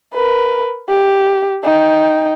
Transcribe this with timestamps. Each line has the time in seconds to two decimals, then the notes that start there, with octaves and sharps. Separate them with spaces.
0.14 A#4 B4
0.89 G4
1.64 D#4 G5